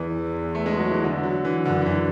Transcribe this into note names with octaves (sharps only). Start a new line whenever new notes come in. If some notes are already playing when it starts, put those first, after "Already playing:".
Already playing: E2 E3
A3
G#3
F#3
E3
D3
F#3
E3
F#2 D3
D3
E3